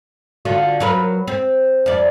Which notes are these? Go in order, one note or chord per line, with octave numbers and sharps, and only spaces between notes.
D3 F4 F#4
F#3 A#4 B4
C4
F2 D5